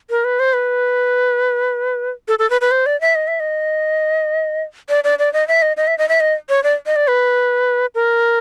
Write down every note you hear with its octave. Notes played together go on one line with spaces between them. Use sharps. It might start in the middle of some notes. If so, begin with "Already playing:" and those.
A#4
B4
C5
B4
A4
A4
B4
B4
C5
D5
E5
D#5
E5
D#5
D5
D5
D5
D#5
E5
D#5
D#5
E5
D#5
E5
D#5
C#5
D5
D#5
D5
B4
A#4